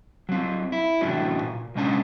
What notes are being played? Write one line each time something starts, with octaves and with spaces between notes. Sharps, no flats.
F#3 C4
E4
C2 F#2 A2 E3 D4 F#4
A#2
C2 A#2 G#3 C#4 D4 A5